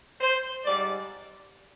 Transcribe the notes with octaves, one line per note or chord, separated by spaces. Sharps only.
C5
G#2 G3 D5